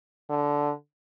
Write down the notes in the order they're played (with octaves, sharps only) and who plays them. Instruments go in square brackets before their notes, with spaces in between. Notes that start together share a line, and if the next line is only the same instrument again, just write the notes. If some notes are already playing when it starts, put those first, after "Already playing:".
[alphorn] D3